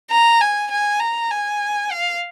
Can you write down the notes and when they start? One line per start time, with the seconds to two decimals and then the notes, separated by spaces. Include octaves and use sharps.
0.11 A#5
0.41 G#5
0.71 G#5
1.00 A#5
1.31 G#5
1.91 F5